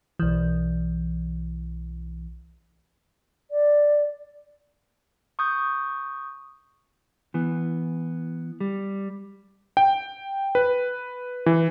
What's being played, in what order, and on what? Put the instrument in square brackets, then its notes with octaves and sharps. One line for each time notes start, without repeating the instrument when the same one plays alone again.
[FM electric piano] B1 E3
[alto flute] D5
[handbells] C#6 D#6 G6
[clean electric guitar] E3 B3
G3
[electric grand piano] G5
B4
E3